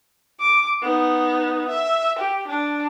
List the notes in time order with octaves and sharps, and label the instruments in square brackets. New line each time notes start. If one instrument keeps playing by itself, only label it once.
[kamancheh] D6
B3 D#4
E5
G4
D4